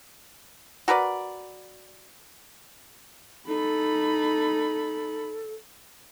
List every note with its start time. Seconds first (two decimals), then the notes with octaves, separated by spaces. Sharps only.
0.88 F#4 A#4 B4 D5
3.48 D#4 A4 B5